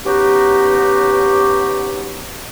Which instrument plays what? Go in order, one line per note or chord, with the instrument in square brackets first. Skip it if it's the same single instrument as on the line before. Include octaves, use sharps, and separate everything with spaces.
[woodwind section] B3 C#4 D#4 F#4 G4